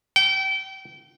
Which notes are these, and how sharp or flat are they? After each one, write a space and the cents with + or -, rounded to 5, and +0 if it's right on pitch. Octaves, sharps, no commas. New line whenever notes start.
G5 -30